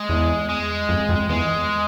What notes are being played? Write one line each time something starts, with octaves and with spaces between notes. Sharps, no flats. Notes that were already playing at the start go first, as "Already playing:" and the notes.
Already playing: G#3
E2
G#3
F2
F2
E2 G#3